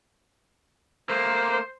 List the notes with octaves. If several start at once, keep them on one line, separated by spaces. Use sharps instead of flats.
A3 A#3 C5